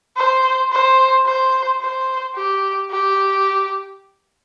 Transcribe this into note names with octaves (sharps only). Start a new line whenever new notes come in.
C5
C5
C5
C5
G4
G4